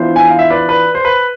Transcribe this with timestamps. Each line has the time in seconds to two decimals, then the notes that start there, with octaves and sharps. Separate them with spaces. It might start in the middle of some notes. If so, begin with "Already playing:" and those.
Already playing: E3 B3 D4 F4 C5 E5
0.16 G#5
0.28 F5
0.39 E5
0.50 B4 D5
0.69 B4
0.95 C5
1.05 B4